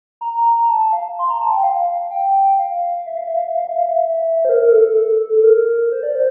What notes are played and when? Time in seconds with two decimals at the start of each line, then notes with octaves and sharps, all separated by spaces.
0.21 A#5
0.68 A5
0.80 A5
0.93 F5
1.19 C6
1.30 A#5
1.41 A5
1.52 G5
1.63 F5
2.11 G5
2.59 F5
3.06 E5
3.17 F5
3.27 E5
3.38 F5
3.48 E5
3.58 F5
3.69 E5
3.79 F5
3.89 E5
4.45 C5
4.49 A#4
4.62 A#4
4.72 A4
4.96 A4
5.34 A4
5.44 A#4
5.92 C5
6.03 D5
6.15 C5